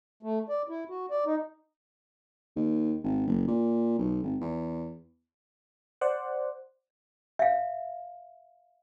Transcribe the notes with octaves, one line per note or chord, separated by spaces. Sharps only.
A3
D5
E4
F#4
D5
D#4
D#2
G#1
F#1
A#2
B1
G#1
E2
C5 D5 F#5
E5 F5